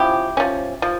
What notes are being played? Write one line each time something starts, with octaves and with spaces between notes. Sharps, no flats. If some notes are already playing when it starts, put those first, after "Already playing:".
Already playing: F3 C#4 E4 G4
F3 C#4
F3